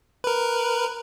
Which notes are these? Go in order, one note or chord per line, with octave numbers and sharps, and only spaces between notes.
A#4 B4